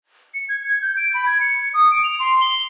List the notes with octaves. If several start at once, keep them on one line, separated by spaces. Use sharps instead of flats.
C#7
G#6
G6
D7
B5
G#6
C#7
D#6
D7
F7
C6
G7